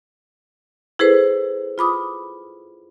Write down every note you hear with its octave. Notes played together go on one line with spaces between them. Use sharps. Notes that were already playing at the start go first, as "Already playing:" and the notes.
E4 G#4 A4 B4 C5
F4 B5 D6 D#6